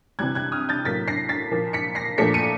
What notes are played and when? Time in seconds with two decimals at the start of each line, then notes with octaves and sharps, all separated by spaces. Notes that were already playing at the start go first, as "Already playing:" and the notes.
0.19 C3 E3 G3 F#6 G#6
0.35 F#6 G#6
0.52 D#6 F6
0.69 G6 A6
0.85 A2 F#3 A#3 A6 B6
1.08 A#6 C7
1.29 A6 B6
1.51 A#2 F3 A#3
1.73 B6 C#7
1.95 A#6 C7
2.18 A#2 F3 A3 D4 B6 C#7
2.34 C#7 D#7